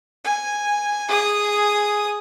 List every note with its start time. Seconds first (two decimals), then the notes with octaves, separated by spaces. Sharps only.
0.24 G#5
1.09 G#4 D#6